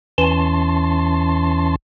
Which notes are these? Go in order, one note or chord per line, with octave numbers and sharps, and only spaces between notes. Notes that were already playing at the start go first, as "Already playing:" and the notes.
E2 E3 C#4 A5 C6